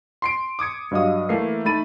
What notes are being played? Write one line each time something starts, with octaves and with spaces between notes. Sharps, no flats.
C6 C7 D7
D6 D#6 G#6 C#7
G2 F#3 D#5 F5 D#6
E3 A3 A#3 A#4 C7
A3 D#4 B5 A6 D#7